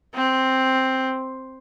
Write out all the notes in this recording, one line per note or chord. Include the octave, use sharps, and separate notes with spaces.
C4